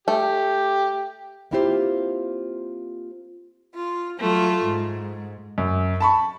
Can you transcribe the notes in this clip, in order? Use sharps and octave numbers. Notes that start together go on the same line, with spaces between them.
A3 G4
A#3 C4 E4 F4 G4 C5
F4
F#3 A3 F4
G#2
F#2
A5 B5 C#6